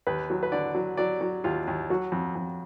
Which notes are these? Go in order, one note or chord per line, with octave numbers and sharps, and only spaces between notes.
D#2 B4
F#3
B4
D3 D5
F#3
F#3 D5
F#3
D#2 F4
D#2
F#3 F#4
F2
F2